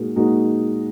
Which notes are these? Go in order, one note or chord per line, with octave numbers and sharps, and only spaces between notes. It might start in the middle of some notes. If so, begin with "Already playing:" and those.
Already playing: A#2 G#3 D#4 F#4 A#4
A#2 G#3 D#4 F#4 A#4